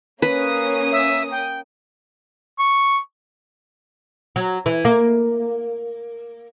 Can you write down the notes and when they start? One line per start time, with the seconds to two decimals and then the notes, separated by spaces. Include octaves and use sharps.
0.22 A#3 C#4 B4 D#6
0.92 E5
1.31 G5
2.59 C#6
4.36 F#3
4.66 E3
4.85 A#3